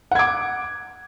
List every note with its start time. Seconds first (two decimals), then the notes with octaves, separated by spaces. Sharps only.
0.11 F#5
0.15 G#6
0.19 D6